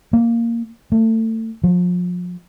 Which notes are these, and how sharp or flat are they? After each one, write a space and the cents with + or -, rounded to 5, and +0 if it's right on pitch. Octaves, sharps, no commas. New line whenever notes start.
A#3 -5
A3 +30
F3 +35